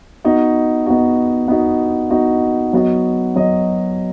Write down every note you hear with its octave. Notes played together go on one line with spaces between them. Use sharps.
B3 D#4 F#4
B3 D#4 F#4
B3 D#4 F#4
B3 D#4 F#4
F#3 B3 F#4 D#5
F#3 B3 F#4 D#5